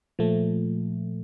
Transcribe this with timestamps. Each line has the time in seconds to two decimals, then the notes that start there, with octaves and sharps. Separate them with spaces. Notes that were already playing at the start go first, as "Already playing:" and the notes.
0.19 A#2 F3 A3